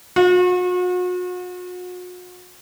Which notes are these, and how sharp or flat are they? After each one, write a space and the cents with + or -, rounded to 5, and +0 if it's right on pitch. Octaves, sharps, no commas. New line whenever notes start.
F#4 -40